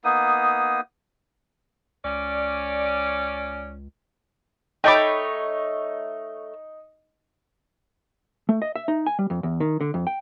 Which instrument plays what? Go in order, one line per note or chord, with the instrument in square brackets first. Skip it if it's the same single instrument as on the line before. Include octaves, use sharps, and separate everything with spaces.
[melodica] A#3 B3 D#4 D#6
[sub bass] C#2 [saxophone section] C#4 D5
[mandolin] A3 C#5 B5 [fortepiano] D#4 [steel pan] G5 A5 D6
[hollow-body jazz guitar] A3
D#5
E5
D#4
G#5
G3
F2
E2
D#3
D3
F2
G5